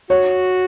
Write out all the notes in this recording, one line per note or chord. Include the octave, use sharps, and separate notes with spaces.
F#4 C#5